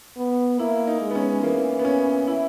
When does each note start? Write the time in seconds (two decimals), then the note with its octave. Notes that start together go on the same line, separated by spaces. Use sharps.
0.17 B3
0.58 A#3 E4
0.87 D#4
1.01 G#3
1.11 B3
1.15 C#4
1.43 E3 A#3
1.79 B3
1.85 C#4
2.27 E4